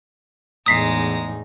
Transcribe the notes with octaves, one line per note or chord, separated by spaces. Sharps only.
E2 A2 G#3 D#4 A#5 D#6 B6 C7